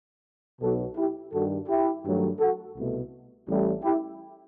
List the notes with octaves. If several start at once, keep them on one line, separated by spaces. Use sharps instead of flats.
B1 B2 F#3 F#4 A4
E4 G4
G2 D#3 G3 F#4 A4
E4 G4
G2 D#3 F#3 A3
F#4 A4
C2 B2 A3
A1 A2 G3
E4 G4